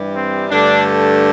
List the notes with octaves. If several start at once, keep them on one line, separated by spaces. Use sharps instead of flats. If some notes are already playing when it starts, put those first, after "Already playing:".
Already playing: G2 E3 G3
C4
G2 D3 A3 D4